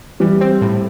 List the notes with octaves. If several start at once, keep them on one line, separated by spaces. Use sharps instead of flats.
E3 G3
C4
A2